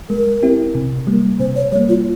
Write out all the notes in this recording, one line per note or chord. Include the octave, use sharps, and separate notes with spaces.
G#3 A#4
C4 E4 G4
C3
G3 A#3
C3 C5
C#5
G3 A#3 C#5
F4